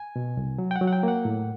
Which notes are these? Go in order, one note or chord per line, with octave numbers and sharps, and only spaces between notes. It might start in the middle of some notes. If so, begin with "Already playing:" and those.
Already playing: G#5
B2
C2
F#3
G5
F#5
F#3
F#5
G5
A#3 F#5
A2